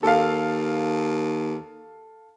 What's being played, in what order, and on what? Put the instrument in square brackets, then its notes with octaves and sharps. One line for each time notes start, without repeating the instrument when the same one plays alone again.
[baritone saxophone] D#2 [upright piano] A4 F5